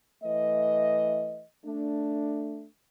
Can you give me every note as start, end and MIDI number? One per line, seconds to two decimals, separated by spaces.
0.24 1.44 52
0.24 1.44 57
0.24 1.44 75
1.65 2.65 57
1.65 2.65 62